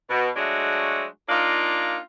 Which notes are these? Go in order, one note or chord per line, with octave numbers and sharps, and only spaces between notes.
B2
F#3 G#3 A3 D4 F#4
A#3 D4 D#4 F4